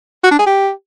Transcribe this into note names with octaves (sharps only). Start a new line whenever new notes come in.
F#4
D4
G#4
G4